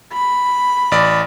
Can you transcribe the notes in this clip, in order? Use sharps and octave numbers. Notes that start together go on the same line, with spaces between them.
B5
A1 D5